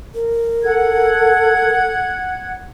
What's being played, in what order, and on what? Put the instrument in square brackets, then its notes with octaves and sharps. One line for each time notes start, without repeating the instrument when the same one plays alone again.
[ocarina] A#4
[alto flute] A4 [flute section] F#5 G#6